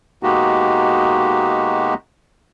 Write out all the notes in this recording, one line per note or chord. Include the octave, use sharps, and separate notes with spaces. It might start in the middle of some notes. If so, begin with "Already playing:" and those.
B2 G#3 A#3 D#4 F#4 G4